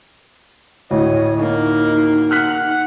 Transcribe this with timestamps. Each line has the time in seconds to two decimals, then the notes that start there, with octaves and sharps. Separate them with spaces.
0.91 D2 A2 C#5 D#5
1.39 A#3 D#4
2.31 F#5 F6 F#6 B6